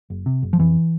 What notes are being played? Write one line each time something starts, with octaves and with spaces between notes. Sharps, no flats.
F#1
C3
F#1
F3
F2 E3